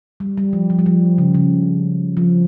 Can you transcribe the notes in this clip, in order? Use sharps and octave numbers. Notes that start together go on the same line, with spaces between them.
G3
G3
F3
F3
G3
F3
C#3
C#3
F3